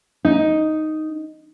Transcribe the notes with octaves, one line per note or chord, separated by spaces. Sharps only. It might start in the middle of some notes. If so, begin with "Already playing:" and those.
D#4